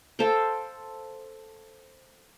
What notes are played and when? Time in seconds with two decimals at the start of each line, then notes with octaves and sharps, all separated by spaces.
0.19 A4 C5 F5 G5